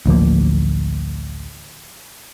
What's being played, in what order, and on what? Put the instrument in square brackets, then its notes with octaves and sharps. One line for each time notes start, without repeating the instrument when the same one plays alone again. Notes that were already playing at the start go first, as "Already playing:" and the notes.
[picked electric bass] A1 D2 F3 A#3